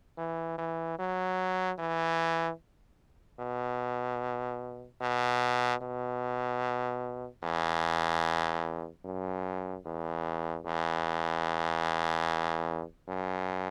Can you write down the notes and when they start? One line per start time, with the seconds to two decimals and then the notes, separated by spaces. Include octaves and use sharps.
0.18 E3
0.58 E3
0.99 F#3
1.79 E3
3.40 B2
5.01 B2
5.82 B2
7.43 E2
9.05 F#2
9.86 E2
10.66 E2
13.08 F#2